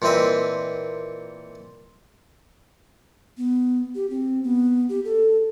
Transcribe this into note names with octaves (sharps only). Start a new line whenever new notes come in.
A#2 E3 C4 D#5 E5
B3
G4
C4
B3
G4
A4